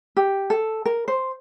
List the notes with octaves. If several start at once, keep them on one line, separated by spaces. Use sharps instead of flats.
G4
A4
A#4
C5